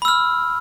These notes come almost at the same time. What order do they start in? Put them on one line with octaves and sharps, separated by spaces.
B5 E6 F6